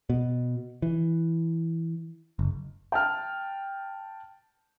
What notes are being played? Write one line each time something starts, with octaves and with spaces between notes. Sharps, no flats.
B2
E3
F#1
G5 A5 F6